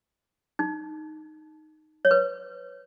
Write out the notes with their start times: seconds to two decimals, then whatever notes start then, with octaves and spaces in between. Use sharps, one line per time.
0.59 D#4
2.05 C#5
2.11 B4